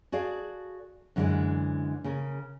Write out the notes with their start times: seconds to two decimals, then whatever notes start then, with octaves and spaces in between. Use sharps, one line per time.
0.12 F#4 G#4 A4 D5 F5
1.16 F#2 D3 E3 F3 G#3 D5
2.04 C#3 C#4 A#4